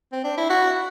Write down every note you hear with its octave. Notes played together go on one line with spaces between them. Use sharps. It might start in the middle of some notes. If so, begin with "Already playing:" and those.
C4
D4
E4
F#4